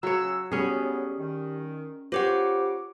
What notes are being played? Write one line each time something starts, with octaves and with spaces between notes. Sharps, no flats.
C#3 F#3 C#5 E6
A2 F#3 G3 B3 C#4 G#4
D#3
F4 G4 C5 C#5 F#5 D6